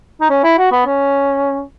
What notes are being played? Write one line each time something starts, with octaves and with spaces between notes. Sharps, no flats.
D#4
C#4
E4
F#4
B3
C#4